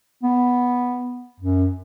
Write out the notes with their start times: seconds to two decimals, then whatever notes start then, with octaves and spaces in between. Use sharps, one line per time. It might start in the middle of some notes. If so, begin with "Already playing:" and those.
0.23 B3
1.40 F#2